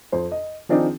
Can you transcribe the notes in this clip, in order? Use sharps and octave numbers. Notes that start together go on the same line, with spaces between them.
F2 C5
D#5
D#3 F3 C4 D4 D#4 G#4